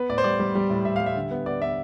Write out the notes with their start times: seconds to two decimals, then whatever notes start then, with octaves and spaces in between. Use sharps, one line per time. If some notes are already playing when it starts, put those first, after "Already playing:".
Already playing: B3 B4
0.09 A2 D5
0.18 C5
0.24 G3 D5
0.39 G3
0.55 G3
0.70 A2
0.85 A2 E5
0.96 G3 F5
1.06 E5
1.15 D3
1.31 B3
1.46 B3 D5
1.61 B3 E5